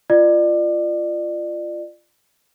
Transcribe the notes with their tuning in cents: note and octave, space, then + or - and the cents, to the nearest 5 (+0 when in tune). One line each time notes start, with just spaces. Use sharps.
F4 -15 D5 +35